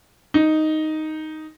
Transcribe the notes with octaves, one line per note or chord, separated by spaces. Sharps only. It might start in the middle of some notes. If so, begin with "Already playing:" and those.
D#4